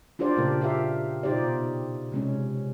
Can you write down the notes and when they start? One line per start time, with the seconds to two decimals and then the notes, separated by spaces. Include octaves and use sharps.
0.19 D4 F4 G4 C5 D5
0.37 A#2 C#3 A#3 G4 A#4
0.61 F4 G4 A#4 E5 F5
1.23 B2 D#4 F4 G4 C5 D5
2.12 C3 G#3 C#4